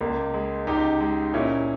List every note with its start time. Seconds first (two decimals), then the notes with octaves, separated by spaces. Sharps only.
0.01 C#2 A#3
0.34 G#3
0.67 C#2 D#4 G4
1.01 G#3
1.34 A#2 C#4 E4